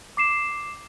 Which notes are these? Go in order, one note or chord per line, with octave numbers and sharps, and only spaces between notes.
D6 C7 E7